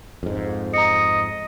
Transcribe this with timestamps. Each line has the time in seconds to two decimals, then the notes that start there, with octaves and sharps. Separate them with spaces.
0.23 F2 G#2
0.74 D#5 A#5 C#7